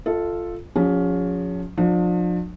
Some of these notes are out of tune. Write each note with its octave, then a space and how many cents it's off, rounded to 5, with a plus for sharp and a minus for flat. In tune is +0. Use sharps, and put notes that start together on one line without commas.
F4 +0 A4 +0 D#5 +45
F3 +40 C#4 +20 G#4 -30
F3 +35 D4 +35